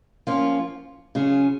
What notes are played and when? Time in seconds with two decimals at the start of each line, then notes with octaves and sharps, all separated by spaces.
0.27 F3 A#3 C#4 F4
1.15 C#3 F#3 C#4 F4 G#4